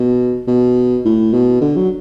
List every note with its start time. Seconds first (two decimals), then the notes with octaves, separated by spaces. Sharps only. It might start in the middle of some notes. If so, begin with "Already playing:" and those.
Already playing: B2
0.48 B2
1.05 A2
1.33 B2
1.61 D3
1.76 F#3